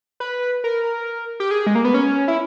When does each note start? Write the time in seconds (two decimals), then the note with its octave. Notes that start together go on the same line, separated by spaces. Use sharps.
0.20 B4
0.64 A#4
1.40 G4
1.51 G#4
1.67 G#3
1.75 A#3
1.85 B3
1.94 C#4
2.28 E4